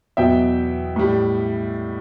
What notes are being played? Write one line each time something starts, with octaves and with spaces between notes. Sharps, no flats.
E2 B2 F#3 E5 G5
A2 G3